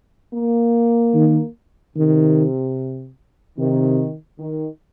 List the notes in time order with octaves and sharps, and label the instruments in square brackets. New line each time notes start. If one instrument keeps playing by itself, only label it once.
[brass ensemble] A#3
[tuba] D#3
[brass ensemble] C3 [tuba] D#3
[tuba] C3 [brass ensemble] D#3
[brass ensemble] D#3